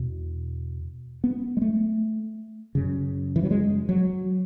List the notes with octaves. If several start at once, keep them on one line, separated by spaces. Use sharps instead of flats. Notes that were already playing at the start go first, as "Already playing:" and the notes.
Already playing: E2 B2
B3
G#3
A3
F#2 C#3
E3
F#3
G#3
F#3